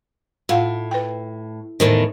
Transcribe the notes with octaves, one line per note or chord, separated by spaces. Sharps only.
A2 F4 F5 F#5
B4 G5
E2 A2 D#3 C5